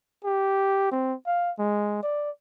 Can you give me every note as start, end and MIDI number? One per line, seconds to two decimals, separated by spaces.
0.24 0.90 67
0.91 1.14 60
1.26 1.51 77
1.59 2.02 56
2.03 2.30 74